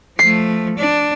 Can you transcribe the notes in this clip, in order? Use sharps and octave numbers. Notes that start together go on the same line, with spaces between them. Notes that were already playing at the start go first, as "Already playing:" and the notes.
F3 A3 C7
D4